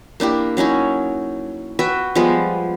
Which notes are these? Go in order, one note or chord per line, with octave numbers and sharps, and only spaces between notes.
A#3 D4 E4 G4
F#3 C#4 D#4 E4
F#4 B4 E5 G5
F3 G3 G#3 B3